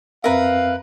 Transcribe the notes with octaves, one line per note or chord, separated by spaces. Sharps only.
F2 C4 A#4 B4 E5 F5